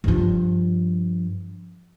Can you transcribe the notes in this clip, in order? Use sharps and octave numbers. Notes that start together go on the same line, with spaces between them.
G2 F3